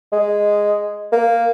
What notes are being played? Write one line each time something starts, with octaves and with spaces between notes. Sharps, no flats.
G#3
A#3